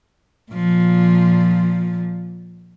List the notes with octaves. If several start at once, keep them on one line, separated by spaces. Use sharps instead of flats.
A#2 F3